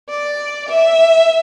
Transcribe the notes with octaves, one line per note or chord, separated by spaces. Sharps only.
D5
E5